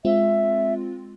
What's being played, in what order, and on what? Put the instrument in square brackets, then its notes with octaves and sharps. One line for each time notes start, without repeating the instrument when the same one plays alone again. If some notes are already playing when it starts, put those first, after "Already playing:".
[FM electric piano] G#3 C4 F4 [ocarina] E5